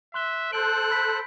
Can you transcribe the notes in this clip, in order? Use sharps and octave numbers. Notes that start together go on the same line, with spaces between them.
E5 C6 F#6 G7
A4 C5 F#6 G6 D7
B5 B6